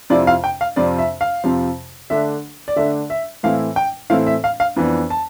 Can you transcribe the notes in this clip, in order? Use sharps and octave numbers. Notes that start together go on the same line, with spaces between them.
F2 C3 F3 C4 E4 D5
F5
G5
F5
F2 C3 F3 C4 D5
E5
F5
F2 C3 F3 C4
D3 A3 D4 E5
D5
D3 A3 D4 E5
E5
A2 E3 A3 C4 E4 F5
G5
A2 E3 A3 C4 E4 F5
E5
F5
F5
F2 E3 B3 D4
A5